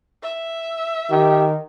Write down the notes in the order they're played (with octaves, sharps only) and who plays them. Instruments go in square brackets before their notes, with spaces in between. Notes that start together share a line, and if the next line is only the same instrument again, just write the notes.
[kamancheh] E5
[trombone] D#3 [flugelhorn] G4